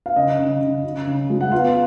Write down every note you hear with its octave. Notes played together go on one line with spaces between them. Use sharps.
F5
C#3 D#5
C#3
C#3
C#3
C#3
G#3
F#5
B3 F4 F5